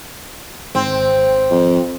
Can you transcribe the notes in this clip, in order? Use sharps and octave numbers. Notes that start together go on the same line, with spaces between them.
G#1 C4
F2